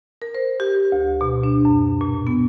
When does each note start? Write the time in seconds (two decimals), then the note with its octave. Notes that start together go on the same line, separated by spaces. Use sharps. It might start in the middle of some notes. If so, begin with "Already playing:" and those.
0.22 A#4
0.35 C5
0.60 G4
0.92 D2
1.21 B2
1.44 D4
1.65 F#2
2.01 A#2
2.27 B3